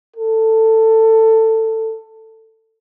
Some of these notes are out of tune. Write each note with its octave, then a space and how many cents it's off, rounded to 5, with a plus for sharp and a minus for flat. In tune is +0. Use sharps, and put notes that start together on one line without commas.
A4 +15